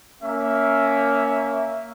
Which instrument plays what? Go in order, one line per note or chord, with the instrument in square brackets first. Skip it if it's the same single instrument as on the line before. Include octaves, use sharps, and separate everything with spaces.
[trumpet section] A#3 C#4 E5